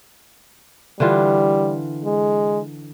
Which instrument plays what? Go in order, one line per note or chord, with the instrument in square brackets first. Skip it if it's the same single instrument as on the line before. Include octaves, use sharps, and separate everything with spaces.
[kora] D3 E3 F4 [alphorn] G3
[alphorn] G#3